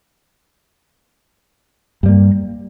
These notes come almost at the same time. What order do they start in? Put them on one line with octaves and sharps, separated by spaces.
G2 G3 A#3